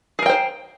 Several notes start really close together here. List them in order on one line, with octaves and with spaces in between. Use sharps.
G#4 A#4 G5 C5